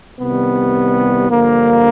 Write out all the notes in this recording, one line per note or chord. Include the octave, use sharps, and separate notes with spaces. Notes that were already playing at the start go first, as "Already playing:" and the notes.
C2 C3 D#3 G3 B3
G2 D3 F3 A#3